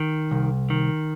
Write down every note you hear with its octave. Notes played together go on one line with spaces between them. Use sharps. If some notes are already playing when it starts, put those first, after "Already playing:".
Already playing: D#3
C2
D#3